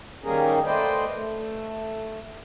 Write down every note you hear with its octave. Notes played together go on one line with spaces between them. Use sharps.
D#3 G3 A#3 C#4 G#4 A#4
A3 B4 C5 D5 D#5 G5
A3